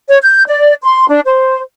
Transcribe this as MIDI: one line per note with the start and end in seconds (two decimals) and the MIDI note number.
0.08 0.17 73
0.23 0.43 91
0.48 0.74 74
0.84 1.07 84
1.08 1.19 62
1.25 1.60 72